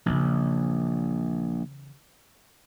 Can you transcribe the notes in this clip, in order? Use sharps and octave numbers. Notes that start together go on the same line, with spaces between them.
A#1 E2 C#3